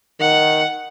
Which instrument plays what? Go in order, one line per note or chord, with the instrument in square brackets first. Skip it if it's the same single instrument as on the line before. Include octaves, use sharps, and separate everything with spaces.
[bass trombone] D#3 [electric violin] F#5